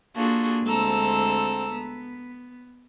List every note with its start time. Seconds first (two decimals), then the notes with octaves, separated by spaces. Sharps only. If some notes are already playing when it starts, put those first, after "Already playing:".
0.15 A#3 D4 F4 F#4 G#4 A4
0.64 D2 G#3 C4 A4 A#5 E6
1.75 B3